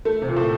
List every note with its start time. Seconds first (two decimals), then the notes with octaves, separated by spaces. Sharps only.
0.05 A3
0.22 C3
0.28 A#2
0.36 A2